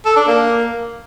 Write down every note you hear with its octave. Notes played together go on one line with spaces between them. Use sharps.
A4
D4
A#3